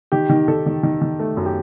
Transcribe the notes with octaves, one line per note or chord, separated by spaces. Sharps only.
D#3 G4
D#3
D#3 A4
D#3
D#3
D#3
A3
F#2
G4